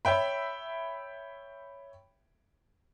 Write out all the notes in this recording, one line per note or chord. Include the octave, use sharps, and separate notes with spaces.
C#5 E5 G5 B5